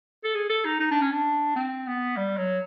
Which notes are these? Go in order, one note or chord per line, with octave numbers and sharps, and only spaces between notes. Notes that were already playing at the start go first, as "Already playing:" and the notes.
A4
G#4
A4
D#4
D#4
D4
C#4
D4
C4
B3
G3
F#3